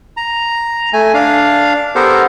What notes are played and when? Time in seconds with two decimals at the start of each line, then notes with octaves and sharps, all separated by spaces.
0.17 A#5
0.93 A3 G#5
1.14 D4 F5
1.95 B3 G4 A4 A#4 C5